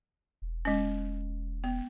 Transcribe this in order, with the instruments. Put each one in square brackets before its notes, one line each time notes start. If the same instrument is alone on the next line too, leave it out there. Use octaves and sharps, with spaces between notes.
[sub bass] E1
[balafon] G#3 C#4
B3